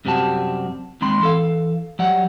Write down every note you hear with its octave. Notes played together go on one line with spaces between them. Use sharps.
F#2 C3 G3 C4 F#4 A5
D#2 D#3 G#3 C4 B5 C6
E3 A4 F5
F#3 G3 F#5